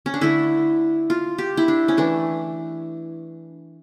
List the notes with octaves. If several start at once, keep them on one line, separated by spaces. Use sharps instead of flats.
C#4
D4
D3 A3 E4
F4
G4
E4
D4
C#4
E3 A3 D4